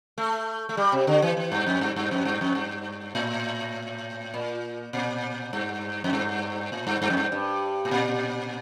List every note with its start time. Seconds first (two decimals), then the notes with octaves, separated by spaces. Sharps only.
0.18 A3
0.69 A3
0.77 G3
0.92 C3
1.07 D3
1.22 E3
1.37 E3
1.52 G2
1.66 F2
1.81 G2
1.96 G2
2.11 F2
2.25 G2
2.41 F2
2.55 G2
3.15 A2
4.34 A#2
4.93 A#2
5.53 G2
6.04 F2
6.13 G2
6.72 A2
6.87 G2
7.02 G2
7.10 F2
7.17 G2
7.32 G2
7.85 A2
7.91 A#2